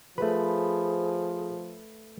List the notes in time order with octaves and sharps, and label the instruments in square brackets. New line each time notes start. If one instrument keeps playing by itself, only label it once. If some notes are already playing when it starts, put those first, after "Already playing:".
[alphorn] F3 [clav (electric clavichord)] A3 B4 [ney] G#4 [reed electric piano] C5 B5